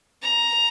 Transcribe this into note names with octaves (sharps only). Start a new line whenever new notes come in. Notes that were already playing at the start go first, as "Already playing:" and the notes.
A#5